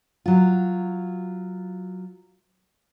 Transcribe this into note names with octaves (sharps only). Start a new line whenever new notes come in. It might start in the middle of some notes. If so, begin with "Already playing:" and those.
F#3 F4